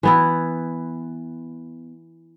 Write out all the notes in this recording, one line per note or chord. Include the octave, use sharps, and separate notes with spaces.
E3 B3 E4